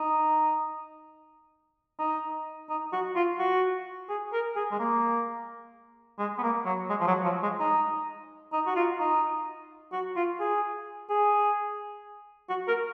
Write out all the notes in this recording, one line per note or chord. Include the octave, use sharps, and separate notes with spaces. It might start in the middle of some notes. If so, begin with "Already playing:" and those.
Already playing: D#4
D#4
D#4
F#4
F4
F#4
G#4
A#4
G#4
G#3
A#3
G#3
B3
A#3
F#3
G#3
F3
F#3
F3
G#3
D#4
D#4
F#4
F4
D#4
F#4
F4
G#4
G#4
F#4
A#4